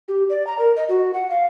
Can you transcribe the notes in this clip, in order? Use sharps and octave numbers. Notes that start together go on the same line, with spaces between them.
G4
D5
A#5
A#4
D#5
F#4
F#5
F5